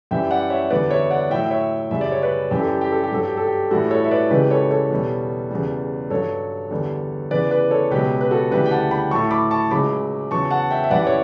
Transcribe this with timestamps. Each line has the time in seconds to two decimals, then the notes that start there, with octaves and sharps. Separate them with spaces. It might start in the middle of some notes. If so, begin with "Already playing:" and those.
0.11 F#2 E3 G3 E5 G5
0.31 D5 F#5
0.50 C#5 E5
0.70 E2 D3 G3 B4 D5
0.91 C#5 E5
1.10 D5 F#5
1.30 A2 F#3 E5 G5
1.51 C#5 E5
1.91 F#2 C#3 G3 E5
2.01 D5
2.12 C#5
2.22 B4 D5
2.51 F#2 E3 G3 G4
2.59 A4
2.68 G4
2.81 G4
2.92 A4
3.04 G4
3.11 G2 F#3 A4
3.25 G4
3.37 A4
3.47 G4
3.70 A2 E3 G3 F#4 A4
3.91 A4 C#5
4.04 E5
4.11 B4 D5
4.31 C#2 C#3 E3 G3 G4 B4
4.50 A4 C#5
4.71 A4 C#5
4.91 E2 B2 G3
5.51 E2 C#3 G3
6.10 G2 F#3 A4 C#5
6.71 E2 D3 G3
7.31 E2 C#3 E3 B4 D5
7.51 B4 D5
7.71 A4 C#5
7.91 C#2 B2 F#3 G4 B4
8.21 B4
8.31 F#4 A4
8.51 D2 C#3 E3 G3 G4 B4
8.66 G5
8.71 F#5 A5
8.91 G5 B5
9.11 A2 F#3 A5 C#6
9.31 B5 D6
9.51 A5 C#6
9.71 C#2 C#3 F#3 B5 D6
10.31 E2 C#3 F#3 A5 C#6
10.51 F#5 A5
10.71 E5 G5
10.84 E5
10.91 F#2 E3 G3 D5 F#5
11.06 C#5 E5